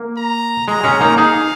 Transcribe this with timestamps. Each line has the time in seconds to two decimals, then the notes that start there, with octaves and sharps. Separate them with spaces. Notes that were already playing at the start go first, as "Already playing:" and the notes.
Already playing: A#3
0.17 A#5
0.67 G#3 A#5
0.83 G#3 C#4
1.01 A#3 D#4
1.18 D#4 G#4 F5